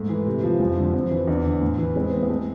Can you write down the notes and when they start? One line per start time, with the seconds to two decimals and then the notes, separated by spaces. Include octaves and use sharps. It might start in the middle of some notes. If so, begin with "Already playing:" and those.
Already playing: G#2 A3
0.09 E3
0.27 C3
0.44 F3
0.60 F2 G#3
0.71 G#3
0.77 D3
0.83 F3
0.94 F2 C4
1.11 E3
1.27 E2 D4
1.45 D3
1.62 A2
1.78 E3
1.96 G#3 C4
2.13 B3 C4
2.23 B3
2.29 G#3 A3